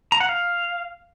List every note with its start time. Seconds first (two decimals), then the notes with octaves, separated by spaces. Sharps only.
0.12 A#5
0.20 F#5
0.29 F5